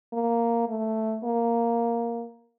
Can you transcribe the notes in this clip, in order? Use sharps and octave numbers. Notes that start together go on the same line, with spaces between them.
A#3
A3
A#3